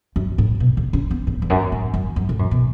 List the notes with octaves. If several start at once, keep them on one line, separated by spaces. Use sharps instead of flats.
F#2
A2
B2
C#3
C#4
B3
A2
E2
F#2
A2
F#2
F#2
A2
F#2
B2